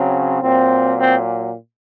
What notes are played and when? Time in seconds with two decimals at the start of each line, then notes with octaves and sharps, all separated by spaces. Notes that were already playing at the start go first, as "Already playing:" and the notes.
Already playing: C#3 F#3 C4
0.41 A#2 F#3 C4
0.98 C4